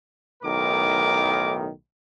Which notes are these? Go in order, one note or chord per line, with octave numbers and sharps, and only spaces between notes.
B1 A2 D#3 A#4 D6